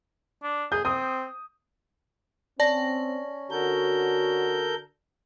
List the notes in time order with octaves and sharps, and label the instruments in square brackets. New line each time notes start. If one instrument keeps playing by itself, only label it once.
[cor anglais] D4
[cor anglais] G#4 [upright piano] G6
[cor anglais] C4 [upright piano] D#6
[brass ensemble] C4 [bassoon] C#4 [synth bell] D5 A5 A#6
[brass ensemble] D3 F#4 [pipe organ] A4 A#4 G6